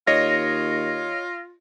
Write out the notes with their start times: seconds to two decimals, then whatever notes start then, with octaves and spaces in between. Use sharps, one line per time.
0.07 D#2 F4 C#5 D#5 A#6